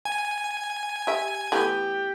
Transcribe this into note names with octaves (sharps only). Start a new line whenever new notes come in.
G#5
G4 E5
E3 A3 B3 G4